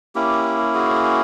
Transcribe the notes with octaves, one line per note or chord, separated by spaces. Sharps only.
A#3 C#4 E4 G4
F#4 G#4